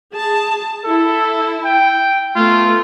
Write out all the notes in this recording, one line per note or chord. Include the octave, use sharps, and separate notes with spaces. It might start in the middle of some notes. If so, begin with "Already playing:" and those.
G#4 A5
E4 A4
G5
A3 B3 F4